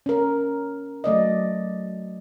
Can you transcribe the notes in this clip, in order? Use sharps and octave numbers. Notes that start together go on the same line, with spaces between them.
C#4 A#4
F#3 A3 D5 D#5